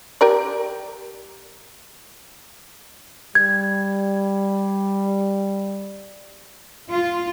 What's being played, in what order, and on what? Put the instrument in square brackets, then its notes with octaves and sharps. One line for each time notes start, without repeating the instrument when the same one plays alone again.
[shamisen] G4 A#4 D5
[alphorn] G3 [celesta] G#6
[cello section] F4